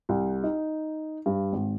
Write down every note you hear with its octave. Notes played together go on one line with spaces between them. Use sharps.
C2
D#4
G2
G#1